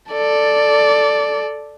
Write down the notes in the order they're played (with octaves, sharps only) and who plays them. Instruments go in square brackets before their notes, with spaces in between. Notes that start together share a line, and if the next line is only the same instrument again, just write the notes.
[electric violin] A4 D5